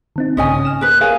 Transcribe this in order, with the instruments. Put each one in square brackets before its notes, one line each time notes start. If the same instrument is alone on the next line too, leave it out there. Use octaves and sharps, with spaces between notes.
[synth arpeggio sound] D#3 C4 D#4
[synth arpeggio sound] B1 G#2 C#3 [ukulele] C#4 D#5 G#5 [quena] D#6
[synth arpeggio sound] F6 E7
[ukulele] A#4 B4 [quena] F#6
[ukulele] G#4 A#4 F5 [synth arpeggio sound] C#5 [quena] G#5